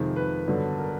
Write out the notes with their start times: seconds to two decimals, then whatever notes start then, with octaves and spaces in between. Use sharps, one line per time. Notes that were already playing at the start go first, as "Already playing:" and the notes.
Already playing: F2 C3 D#3 G#3
0.16 B4
0.48 G2 D3 F#3 B3
0.79 A#4